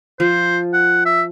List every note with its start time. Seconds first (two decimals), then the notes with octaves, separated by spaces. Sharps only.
0.20 F3 C5
0.74 F#5
1.06 E5